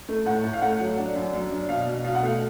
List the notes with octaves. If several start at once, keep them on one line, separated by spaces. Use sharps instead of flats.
A3
A2 F#5
A2
F5
A3 F#5
F#3
D4
F#2
F#2
D4
B2 F5
B2
B2 F5
F#5
A3 F5